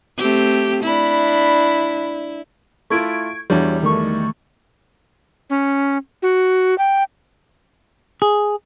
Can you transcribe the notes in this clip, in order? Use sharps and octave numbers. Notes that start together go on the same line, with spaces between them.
A3 C4 G4
D4 E4 B5
A3 E4 F4 C#6 G#6 D7
E2 G3 D4 F#4 C#5
D#3 A3 C#6
C#4
F#4
G5
G#4